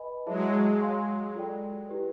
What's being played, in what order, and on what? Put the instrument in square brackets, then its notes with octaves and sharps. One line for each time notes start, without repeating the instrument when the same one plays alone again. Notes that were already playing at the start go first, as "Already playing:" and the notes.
Already playing: [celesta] B4 D#5 G#5 B5
[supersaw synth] F#3 G#3 [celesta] E4 G#4 C#5 E5 A5
[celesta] C#5 F5 G#5 C6
F4 A4 D5 G5
E4 G4 B4